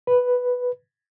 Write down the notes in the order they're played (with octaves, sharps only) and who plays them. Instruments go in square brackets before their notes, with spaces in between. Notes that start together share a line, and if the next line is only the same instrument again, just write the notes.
[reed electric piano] B4